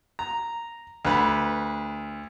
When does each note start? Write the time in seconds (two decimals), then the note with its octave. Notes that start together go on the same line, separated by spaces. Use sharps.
0.19 A#5
1.05 D2 B4